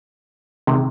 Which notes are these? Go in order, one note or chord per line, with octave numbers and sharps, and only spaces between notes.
C3 D#3 G#3